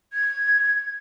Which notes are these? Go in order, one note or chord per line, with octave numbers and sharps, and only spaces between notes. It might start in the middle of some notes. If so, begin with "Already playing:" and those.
G#6